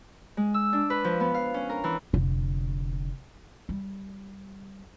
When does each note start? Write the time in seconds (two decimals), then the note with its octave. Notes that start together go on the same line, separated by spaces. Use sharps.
0.37 G#3
0.54 E6
0.73 D4
0.90 B4
1.04 F3
1.20 B3
1.34 F5
1.54 C#4
1.69 A#4
1.84 E3
2.13 F1 D3
3.69 G3